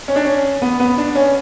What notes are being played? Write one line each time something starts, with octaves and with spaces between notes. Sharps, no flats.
C#4
D4
C#4
B3
B3
D4
C#4